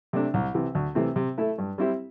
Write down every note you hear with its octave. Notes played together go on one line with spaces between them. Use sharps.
C3 A3 D4
C2
C3 E3
D2
C3 E3 A3 C4
C3
A3 E4 A4
G2
G3 C4 E4 G4